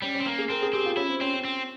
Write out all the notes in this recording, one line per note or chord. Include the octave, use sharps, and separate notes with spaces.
G3 C#4
C#4
C4
A#3 C#4
G#4
C4 A#4
G#4
C4 G4
F4
C#4 E4
C4
C4 C#4
C#4
C4